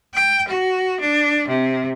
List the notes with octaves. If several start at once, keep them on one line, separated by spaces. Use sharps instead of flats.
G5
F#4
D4
C3